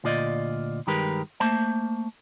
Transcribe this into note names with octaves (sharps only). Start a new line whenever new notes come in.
D2 A#2 F4 D5 D#5
G2 D#3 G#3 G4 A#4 B4
A3 A#3 C5 A5